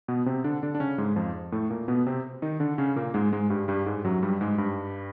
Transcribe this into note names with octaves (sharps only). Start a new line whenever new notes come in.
B2 B3
C3 C4
D3 D4
D3 D4
D4
C#3 C#4
G#2 G#3
F2 F3
A2 A3
A#2 A#3
B2 B3
C3 C4
D#3 D#4
D3 D4
C#3 C#4
A#2 A#3
G#2 G#3
G#2 G#3
G2 G3
G2 G3
G#2 G#3
F#2 F#3
G2 G3
G#2 G#3
G2 G3